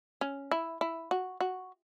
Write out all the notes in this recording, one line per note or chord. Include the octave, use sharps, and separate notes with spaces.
C#4
E4
E4
F#4
F#4